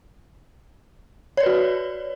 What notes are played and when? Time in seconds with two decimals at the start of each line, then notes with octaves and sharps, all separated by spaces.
1.37 C#5
1.40 D5
1.43 B4
1.46 F#4